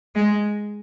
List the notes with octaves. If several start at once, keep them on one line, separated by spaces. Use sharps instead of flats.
G#3